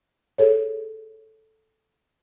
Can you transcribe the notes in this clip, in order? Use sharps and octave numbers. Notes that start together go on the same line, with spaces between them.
G#4 A4 C#5